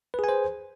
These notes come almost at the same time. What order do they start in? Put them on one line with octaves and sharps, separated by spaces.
B4 G#4 G#5 C5